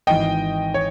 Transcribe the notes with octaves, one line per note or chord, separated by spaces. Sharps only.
G#1 G#2 E3 D#5 G5
C#5